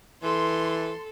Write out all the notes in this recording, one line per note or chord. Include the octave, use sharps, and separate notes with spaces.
E3 A4 C6